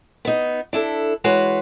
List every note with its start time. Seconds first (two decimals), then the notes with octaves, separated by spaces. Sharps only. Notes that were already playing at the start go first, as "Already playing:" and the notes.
0.25 B3 D#4
0.73 D4 E4 A4
1.24 E3 G#3 F#4 B4 C#5